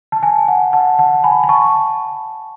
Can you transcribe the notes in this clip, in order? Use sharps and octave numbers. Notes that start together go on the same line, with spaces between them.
A5
G#5
F#5
F#5 A5
F#5 A5
G#5 B5
B5
A5 C#6